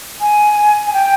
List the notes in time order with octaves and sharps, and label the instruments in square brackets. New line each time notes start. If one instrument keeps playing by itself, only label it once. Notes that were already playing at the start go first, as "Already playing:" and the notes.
[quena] G#5
G#5
G5